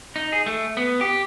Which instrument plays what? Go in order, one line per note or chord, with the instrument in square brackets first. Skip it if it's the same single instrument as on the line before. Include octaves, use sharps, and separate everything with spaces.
[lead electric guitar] D#4
G#4
A3
B3
G4